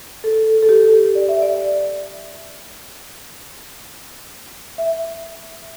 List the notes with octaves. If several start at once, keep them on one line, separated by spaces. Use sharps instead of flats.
A4
A4
G4
D5
E5
D5
E5